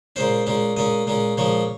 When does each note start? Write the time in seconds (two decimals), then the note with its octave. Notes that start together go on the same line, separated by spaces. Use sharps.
0.16 A#2 G#3 C#4 C5
0.47 A#2 G#3 C#4
0.77 A#2 G#3 C#4 D#5
1.07 A#2 G#3 C#4
1.37 A#2 F3 G#3 C#4 C#5